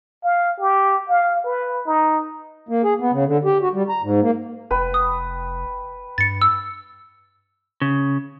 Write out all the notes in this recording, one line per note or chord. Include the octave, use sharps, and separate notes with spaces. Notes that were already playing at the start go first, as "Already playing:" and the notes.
F5
G4
F5
B4
D#4
A#3
G#4
B3
C#3
D3
G4
F#4
G3
A#5
G#2
A#3
F1 B4 G5
D#6
G2 A6 C#7
E6
C#3